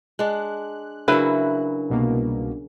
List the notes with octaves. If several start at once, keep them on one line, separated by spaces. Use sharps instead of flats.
G#3 D4 F#6
C#3 F#3 D4 E4 F#4 A#4 B4 E5
C2 B2 A#3